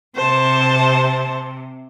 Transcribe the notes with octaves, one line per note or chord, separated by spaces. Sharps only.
C3 C5 A5